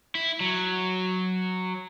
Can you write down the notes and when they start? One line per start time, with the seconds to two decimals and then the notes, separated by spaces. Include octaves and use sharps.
0.15 E4
0.40 F#3